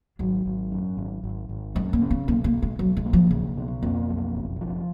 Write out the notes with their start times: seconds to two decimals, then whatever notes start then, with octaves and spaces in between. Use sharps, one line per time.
0.19 G#1 F#3
0.46 G#1
0.72 F#2
0.97 G#1
1.24 G#1
1.49 G#1
1.75 F#2 G#3
1.93 A#3
2.01 C#3
2.11 B3
2.27 B1 A#3
2.44 A#3
2.53 B1
2.62 G#3
2.79 B1 F#3
2.97 G#3
3.06 A#3
3.13 F3
3.31 B1 C#3
3.58 B2
3.83 F2 A#3
4.09 B1
4.36 F#1
4.61 F3